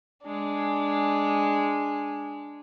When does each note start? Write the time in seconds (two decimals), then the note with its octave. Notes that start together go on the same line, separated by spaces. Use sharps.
0.23 G#3 D4